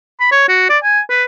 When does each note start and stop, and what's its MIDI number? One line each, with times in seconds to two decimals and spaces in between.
0.20 0.29 83
0.32 0.44 73
0.49 0.65 66
0.69 0.78 74
0.84 1.00 80
1.10 1.24 71